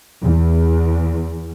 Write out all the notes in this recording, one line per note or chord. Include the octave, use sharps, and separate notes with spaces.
E2